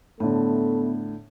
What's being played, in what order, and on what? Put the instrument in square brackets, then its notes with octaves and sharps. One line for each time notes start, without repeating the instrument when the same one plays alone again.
[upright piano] A2 D3 [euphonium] A3 [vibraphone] B3